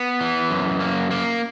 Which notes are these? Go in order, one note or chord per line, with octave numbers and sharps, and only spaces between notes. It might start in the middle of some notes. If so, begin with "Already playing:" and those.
Already playing: B3
E3
F#2
A#3
A#3